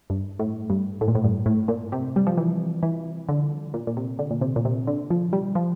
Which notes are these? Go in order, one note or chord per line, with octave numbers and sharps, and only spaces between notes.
G2
A2
G2
A2
A#2
A2
G2
A2
A#2
C3
G3
F3
E3
E3
D3
A#2
A#2
C3
D3
A#2
C3
A#2
C3
D3
F3
G3
F3